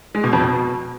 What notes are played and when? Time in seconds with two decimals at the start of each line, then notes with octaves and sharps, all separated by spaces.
0.15 G#3
0.24 B2
0.33 F2
0.42 B2